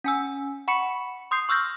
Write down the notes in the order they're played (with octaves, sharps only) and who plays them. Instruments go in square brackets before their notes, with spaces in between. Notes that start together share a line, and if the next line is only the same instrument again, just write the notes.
[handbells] C#4 G#5 E6
F#5 B5 C#6 C#7
C6 D#6 G6 C7
C#6 E6 F6 G6 A#6